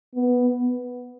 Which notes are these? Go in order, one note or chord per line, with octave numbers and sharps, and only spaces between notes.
B3